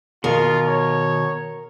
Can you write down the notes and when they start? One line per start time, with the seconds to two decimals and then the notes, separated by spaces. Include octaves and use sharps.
0.24 B2 D#3 F4 A#4
0.68 C#5